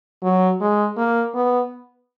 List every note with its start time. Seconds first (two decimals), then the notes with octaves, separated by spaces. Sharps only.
0.23 F#3
0.61 G#3
0.97 A#3
1.35 B3